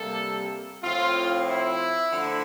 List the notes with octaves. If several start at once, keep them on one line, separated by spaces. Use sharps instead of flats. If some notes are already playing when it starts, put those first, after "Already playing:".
Already playing: C3 G3 A#3 A4
A2 F3 C4 F4
E4
D3 F3 A3